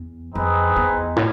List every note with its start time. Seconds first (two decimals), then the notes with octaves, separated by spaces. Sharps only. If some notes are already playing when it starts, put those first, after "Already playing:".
Already playing: E2
0.35 F2 C4 D#4 G#4 B4 D#5
0.76 E2
1.16 A2